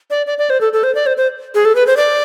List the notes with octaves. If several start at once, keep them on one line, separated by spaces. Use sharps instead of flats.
D5
D5
D5
C5
A4
A4
C5
D5
C5
C5
G#4
A4
B4
C5
D5